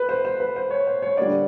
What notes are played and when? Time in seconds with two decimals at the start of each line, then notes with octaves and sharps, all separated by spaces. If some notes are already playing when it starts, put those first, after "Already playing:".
Already playing: B4
0.09 C5
0.25 C5
0.40 B4
0.56 C5
0.71 C#5
0.87 C5
1.02 C#5
1.17 D3 G3 A#3 D4 D5